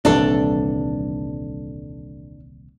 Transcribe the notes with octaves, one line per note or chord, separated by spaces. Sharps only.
D#1 C2 E3 D4 A4